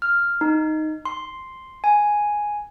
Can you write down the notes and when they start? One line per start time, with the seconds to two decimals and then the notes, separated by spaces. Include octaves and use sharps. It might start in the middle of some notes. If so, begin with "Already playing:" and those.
0.02 F6
0.41 D#4
1.05 C6
1.84 G#5